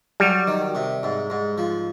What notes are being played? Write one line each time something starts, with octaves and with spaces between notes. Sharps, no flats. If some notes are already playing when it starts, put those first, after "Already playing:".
F#3 G3
D#3
C3
G#2
G#2
F3